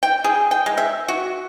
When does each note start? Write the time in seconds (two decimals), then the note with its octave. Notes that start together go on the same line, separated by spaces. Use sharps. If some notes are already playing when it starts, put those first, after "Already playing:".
0.03 G5
0.24 G#4
0.51 G5
0.66 G#3
0.77 E5
1.08 F#4